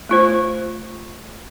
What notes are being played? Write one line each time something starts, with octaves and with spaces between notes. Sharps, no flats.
A3 F4 C5